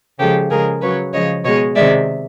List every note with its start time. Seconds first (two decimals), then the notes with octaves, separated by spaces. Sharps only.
0.19 C#3 F3 G#3 G4 A4
0.51 C#3 F3 G#3 G#4 A#4
0.81 C#3 F#3 B4 C#5
1.13 C#3 F3 G#3 C#5 D#5
1.44 B2 G#3 C#5 D#5
1.76 C3 D#3 G#3 D5 E5